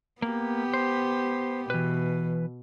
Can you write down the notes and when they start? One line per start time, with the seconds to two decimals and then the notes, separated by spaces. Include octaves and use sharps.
0.22 A#3 B3 G4
0.74 C5
1.70 B2 E3 B4